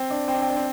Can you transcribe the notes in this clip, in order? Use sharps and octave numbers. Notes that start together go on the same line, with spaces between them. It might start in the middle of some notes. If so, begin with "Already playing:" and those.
Already playing: C4
D4
C4
D4
C4
D4
C4